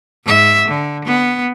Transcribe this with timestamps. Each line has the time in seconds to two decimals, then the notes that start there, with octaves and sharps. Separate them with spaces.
0.25 G#2 E5
0.68 D3
1.05 B3